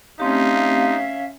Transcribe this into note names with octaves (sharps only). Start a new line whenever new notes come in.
A3 C4 C#4 D#4 G4 E5 F5